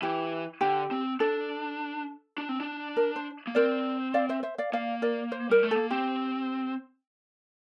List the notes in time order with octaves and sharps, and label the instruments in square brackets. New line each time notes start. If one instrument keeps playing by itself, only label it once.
[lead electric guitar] E3 [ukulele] G4
[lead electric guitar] D3 [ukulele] G4
[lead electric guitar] C4
[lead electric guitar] D4 [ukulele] A4
[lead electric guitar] D4
C4
D4
[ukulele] A#4
C5
[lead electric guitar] A#3
[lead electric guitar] C4 [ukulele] A#4 D5
[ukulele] D5 F5
C5 E5
C5 E5
D5 F5
[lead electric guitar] A#3 [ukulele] D5 F5
[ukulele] A#4 D5
C5
[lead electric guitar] G3 [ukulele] A#4
[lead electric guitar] A3
[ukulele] A4
[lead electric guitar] A#3
[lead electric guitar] C4 [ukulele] G4